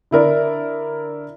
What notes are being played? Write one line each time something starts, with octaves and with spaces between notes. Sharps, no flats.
D3 E4 A#4 D5